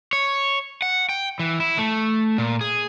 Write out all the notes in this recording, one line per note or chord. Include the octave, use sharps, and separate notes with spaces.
C#5
F#5
G5
E3
E4
A3
A#2
G#4